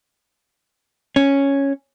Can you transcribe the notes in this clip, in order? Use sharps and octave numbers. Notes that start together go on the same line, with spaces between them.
C#4